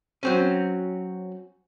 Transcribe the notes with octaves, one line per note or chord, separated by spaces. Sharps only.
F#3 C4 C#4